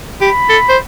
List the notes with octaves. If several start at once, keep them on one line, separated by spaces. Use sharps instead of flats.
G4 B5
A4
C5